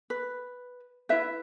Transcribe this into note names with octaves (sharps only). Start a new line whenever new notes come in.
B4
E4 B4 E5